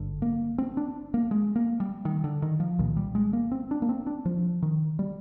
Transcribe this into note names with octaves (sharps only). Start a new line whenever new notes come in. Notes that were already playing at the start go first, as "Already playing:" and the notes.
Already playing: G#1 G2 D3
A#3
C4
D4
A#3
G#3
A#3
G3
D#3
D3
D#3
F3
C2 A#2 D#3
G3
G#3
A#3
C4
D4
A#3
C4
D4
F3
D#3
G3